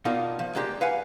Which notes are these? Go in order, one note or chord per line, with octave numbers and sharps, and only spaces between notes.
B2 A#3 D4 D#4 F4
F3
G#3 A#3 D4 G4
B4 F5 F#5 G#5